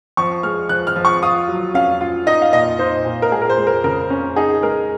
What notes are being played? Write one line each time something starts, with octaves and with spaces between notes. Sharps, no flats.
F3 C#6
G#3 F6
F3 F#6
F6
F3
C#6
F4 D#6
F#3
C#4 F5
F4
D#4 D#5
F5
A#2 D#5
D#4 C5
A#2
A#4
G#3 G#4
A#4
C5
G#3
A#4
C#3 A#4
C#4
D#4 G#4
G#3 A#4